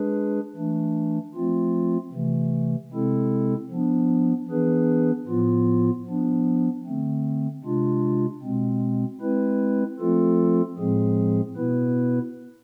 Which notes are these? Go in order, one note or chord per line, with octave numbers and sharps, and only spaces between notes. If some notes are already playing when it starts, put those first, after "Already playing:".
Already playing: G#3 D4 G#4 B4
E3 A3 D4
F3 A3 C4 F4
C3 E3 A3
C3 G#3 C4 E4 A4
F3 B3 D4
E3 B3 D4 G#4 B4
A2 F3 B3 F4
F3 B3 D4
D3 A3 C4
C3 G#3 D4 F4
B2 G#3 C4
G#3 C4 E4 B4
F3 A3 C4 F4 A4
A2 F3 G#3 C4 G#4
B2 B3 E4 B4